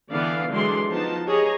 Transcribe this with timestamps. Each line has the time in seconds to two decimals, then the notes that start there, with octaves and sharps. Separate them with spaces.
0.11 D3 E3 B3 D5 F5
0.51 D3 E3 F#3 G#3 D5 C6
0.90 F3 B3 D#4 F4 A5
1.26 G4 G#4 C#5 D#5 A#5